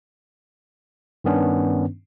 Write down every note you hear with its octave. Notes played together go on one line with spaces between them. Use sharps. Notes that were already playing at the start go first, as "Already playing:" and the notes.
G2 D#3 B3 C#4 D4